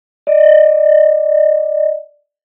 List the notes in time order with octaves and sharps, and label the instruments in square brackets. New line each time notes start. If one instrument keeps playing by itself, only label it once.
[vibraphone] D5 D#5